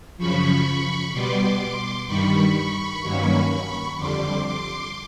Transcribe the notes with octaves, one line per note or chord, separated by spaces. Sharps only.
F#2 C#3 F3 B5 C#6
B2 G3 B3 C6 D6
G2 D#3 G3 B5 C#6
B5 C#6
G2 D#3 F#3 A#3 C#4
F2 D3 G3 C6 D6
C6 D6